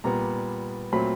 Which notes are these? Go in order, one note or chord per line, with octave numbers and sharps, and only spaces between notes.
A#2 G3 B3 A#5
A#2 F#3 A3 C4 B5